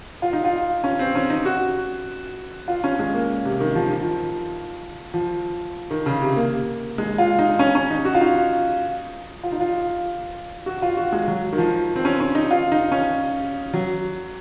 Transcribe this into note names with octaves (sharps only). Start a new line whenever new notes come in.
F4
D#4
F4
C#4
C4
C#4
D#4
F#4
F4
C#4
G#3
A#3
C3
D#3
F3
D#3
F3
F3
D#3
C#3
C3
A#3
G#3
F4
D#4
C#4
C#4
D#4
F#4
F4
D#4
F4
D#4
F4
F#4
F4
F#4
G#3
F#3
D#3
F3
C4
C#4
C#4
D#4
F4
D#4
C#4
F#3